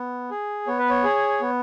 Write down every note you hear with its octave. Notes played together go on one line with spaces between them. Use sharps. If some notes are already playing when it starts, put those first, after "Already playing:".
Already playing: B3
G#4
B3 C#5
B4
C#5
G#4
B3